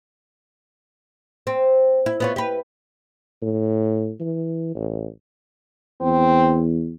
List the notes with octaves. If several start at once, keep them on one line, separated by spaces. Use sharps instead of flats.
C4
E4
B3 F4 C#5
G4 B4
A2
E3
A1
E2 C4